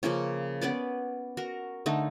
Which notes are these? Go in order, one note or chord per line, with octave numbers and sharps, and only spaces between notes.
C#3 F3 A#3 C#4
B3 C#4 B4 D5
F#4 A#4
D3 A3 D#4